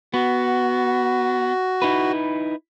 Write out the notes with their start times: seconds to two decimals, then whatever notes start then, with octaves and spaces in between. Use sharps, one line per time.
0.14 B3 F#4
1.82 D#4 E4 B4